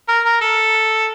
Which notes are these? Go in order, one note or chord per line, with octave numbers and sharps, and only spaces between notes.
A#4
A#4
A4